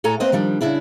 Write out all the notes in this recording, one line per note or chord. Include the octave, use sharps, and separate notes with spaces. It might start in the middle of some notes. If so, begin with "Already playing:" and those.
A2 A4 C#5 G#5 A#5
A#3 C4 B4 C5 D#5
D#3 F3 G3 D4
C#3 D4 E4 G#4